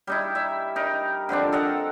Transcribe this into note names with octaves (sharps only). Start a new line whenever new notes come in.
G3 D#4 E4
E5
D#4 A#4
D3 F3 C4 D4
A4 A#4 D#5 F#5